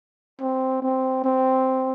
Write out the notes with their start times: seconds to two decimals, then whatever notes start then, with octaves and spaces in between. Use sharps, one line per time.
0.41 C4
0.83 C4
1.24 C4